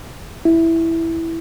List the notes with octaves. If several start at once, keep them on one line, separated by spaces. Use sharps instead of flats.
E4